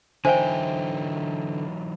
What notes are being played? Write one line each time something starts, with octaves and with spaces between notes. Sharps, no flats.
D3 E3 F#3 D#4 C5 E5 G5 G#5